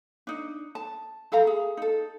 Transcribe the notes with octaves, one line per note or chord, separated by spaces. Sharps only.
D4 D#4
A5
E4 A4 F5 A#5
G#4
D#4 A4